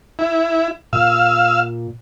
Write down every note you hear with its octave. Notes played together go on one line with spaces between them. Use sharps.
E4
A#2 F5 E6